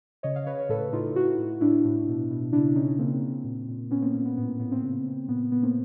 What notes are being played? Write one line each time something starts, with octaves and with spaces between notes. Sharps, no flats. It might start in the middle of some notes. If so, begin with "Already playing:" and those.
C#3 C#5 D#5
D#5 F5
C#3 B4 C#5
B4 C#5
A2 A4 B4
A2 D#4 F4
A2 E4 F#4
A2
A2 D4 E4
A2
B2
B2
C#3 D4 E4
C#3 C#4 D#4
C#3 A#3 C4
C#3
A#2
A#2
A#2 B3 C#4
A#3 C4
A#2 A#3
B3
A2 B3
A#3
A2 B3
A#3 C4
C#3
C#3
A#2 B3
A#2 B3
A#3 C4